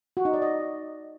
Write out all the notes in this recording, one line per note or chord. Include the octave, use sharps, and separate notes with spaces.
F#4
D#4
D5
D#5